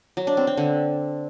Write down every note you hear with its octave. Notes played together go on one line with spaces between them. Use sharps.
F#3
D4
C4
C4
D3